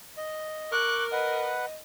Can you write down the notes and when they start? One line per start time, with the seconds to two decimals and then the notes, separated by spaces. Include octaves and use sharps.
0.17 D#5
0.72 A#4 C#6 D6 F#6
1.12 B4 D#5 F#5